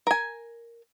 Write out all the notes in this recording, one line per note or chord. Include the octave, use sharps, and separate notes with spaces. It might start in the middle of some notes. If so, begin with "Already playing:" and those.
A#4 G#5